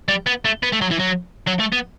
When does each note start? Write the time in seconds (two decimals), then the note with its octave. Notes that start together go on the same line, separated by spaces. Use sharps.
0.08 G3
0.26 B3
0.45 A3
0.63 B3
0.73 A3
0.81 F#3
0.91 E3
0.99 F#3
1.47 F#3
1.60 A3
1.73 B3